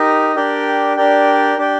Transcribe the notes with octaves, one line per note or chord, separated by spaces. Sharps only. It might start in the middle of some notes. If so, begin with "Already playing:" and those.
Already playing: D#4 G4 A#4 D#5
D4 G4 A#4 D5 G5
D4 G4 A#4 D5 G5
D4 G4 D5 G5